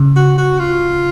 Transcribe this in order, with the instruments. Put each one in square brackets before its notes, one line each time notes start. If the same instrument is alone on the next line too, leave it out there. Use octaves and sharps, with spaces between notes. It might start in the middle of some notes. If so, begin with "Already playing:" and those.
Already playing: [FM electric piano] C#3
[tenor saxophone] F#4
F#4
F4